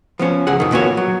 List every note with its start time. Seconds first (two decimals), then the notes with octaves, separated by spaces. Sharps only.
0.19 F3 B3 C#4
0.47 C#2 G#4 F#5
0.60 F2 D#3
0.72 A#2 B3 F#4 C#5
0.97 F#3